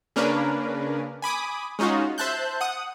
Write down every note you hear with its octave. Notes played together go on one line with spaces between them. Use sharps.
C#3 A#3 C#4 D4 A#4 B4
G#5 B5 D6 D#6
G#3 C#4 D#4 F4 F#4
C5 E5 A5 F#6 G6
F#5 D#6